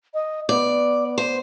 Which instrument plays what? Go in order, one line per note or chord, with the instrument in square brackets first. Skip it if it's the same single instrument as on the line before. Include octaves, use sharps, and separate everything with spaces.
[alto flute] D#5
[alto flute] B3 [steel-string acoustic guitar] D5
[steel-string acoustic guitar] C5